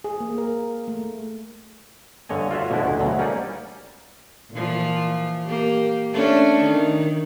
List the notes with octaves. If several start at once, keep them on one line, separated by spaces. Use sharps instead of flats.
G#4
A#3
A#4
A3
G2 D3 C#5 D#5 G#5
F4 F#4 C#5 E5
B2 D3 F3 G#3 B3 E4
D2
D2 B2 F#3
G3 A#3 C#4 D#4 D5
A#2 E3 F3
A#3 G4
A3 C#4 D4
D#3